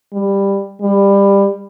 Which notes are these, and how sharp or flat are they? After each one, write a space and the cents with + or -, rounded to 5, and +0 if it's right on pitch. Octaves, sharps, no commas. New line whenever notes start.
G3 +10
G3 +20